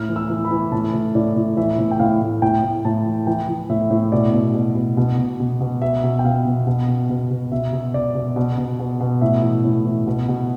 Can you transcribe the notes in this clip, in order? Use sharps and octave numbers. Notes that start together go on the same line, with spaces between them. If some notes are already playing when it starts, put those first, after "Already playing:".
Already playing: A2 F6
E3
E6
E3
B5
E3
A2 A5
A2
A2 D5
A2
E3 E5
A2
G5
A2 F5
A2
A2 G5
A2
A2 A5
E3
E3 G5
E3
A2 E5
A2
B2 D5
B2
B2
B2
B2
B2
B2
B2
B2 E5
B2
G5
B2 F5
B2
B2
B2
B2
B2
B2 E5
B2
B2 D5
B2
B2
B2
B2
B2
A2 E5
E3
A2
E3
B2
B2